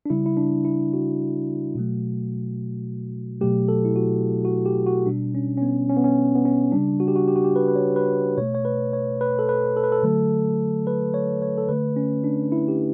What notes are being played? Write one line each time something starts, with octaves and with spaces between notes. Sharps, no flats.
D4
C#3 G3 E4
E4
D4
E4
F#4
B2 F#3 A3
B2 F#3 A3 G4
A4
E4
F#4
F#4
G4
F#4
B2 G3 D4
C#4
C#4
B3
C#4
B3
C#4
B3
C#4
C#3 G3 D4
F#4
G4
F#4
G4
F#4
G4
B4
B4
C#5
B4
B2 A3 C#5
C#5
B4
C#5
B4
A4
B4
A4
B4
A4
D3 F#3 A3
B4
C#5
C#5
A4
D3 A3 B4
C#4
D4
E4
G4